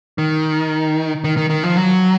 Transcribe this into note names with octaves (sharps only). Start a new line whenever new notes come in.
D#3
D#3
D#3
D#3
F3
F#3